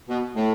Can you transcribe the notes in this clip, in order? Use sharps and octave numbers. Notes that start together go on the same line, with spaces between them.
B2
A2